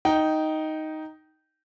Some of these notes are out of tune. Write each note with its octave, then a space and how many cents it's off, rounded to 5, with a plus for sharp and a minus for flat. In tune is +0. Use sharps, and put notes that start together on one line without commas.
D#4 +5 G5 -15